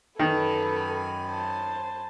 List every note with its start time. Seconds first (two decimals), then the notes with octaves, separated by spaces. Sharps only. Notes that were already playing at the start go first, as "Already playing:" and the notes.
0.19 F#2 D#3 A4 B4 G#5 B5
1.26 C5 A5